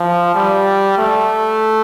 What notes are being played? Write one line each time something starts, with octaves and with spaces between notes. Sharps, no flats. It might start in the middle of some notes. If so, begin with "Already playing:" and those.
Already playing: F3
G3
A3